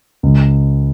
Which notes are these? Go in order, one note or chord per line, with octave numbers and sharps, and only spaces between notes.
C#2